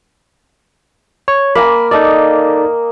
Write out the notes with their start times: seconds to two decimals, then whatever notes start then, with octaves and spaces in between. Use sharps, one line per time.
1.28 C#5
1.55 A#3 G#5 B5
1.91 D#4 A4 D5 D#5